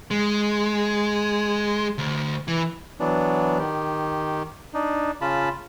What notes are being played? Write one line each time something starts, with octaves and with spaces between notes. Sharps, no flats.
G#3
D2
E3
E3 F#3 B3 D4
D#3 G4
D4 D#4
C#3 F4 A5 B5